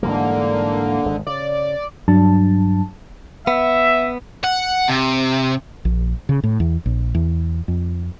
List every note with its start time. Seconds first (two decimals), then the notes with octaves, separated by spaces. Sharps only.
0.03 G#2 D3 E3 G3 A#3
1.06 G#1 G#3
1.27 C#3 D5
2.08 G2 F#3 D4 A5
3.47 B3 E5
4.44 F#5
4.88 C3
5.85 A#1
6.29 C#3
6.44 A2
6.60 E2
6.86 A#1
7.15 E2
7.68 F2